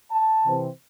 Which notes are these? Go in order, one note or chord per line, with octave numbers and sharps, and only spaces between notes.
A5
C3 E3 C4